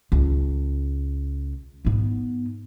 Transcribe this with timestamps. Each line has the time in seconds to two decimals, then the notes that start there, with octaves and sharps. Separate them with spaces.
0.12 C#2
1.85 G#2 B3